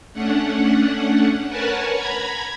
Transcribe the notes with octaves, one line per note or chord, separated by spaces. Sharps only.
A3 C#4 D4 F#5
A#4 B4 C#5 F#5 G#5 A5
A#5 B5 G#6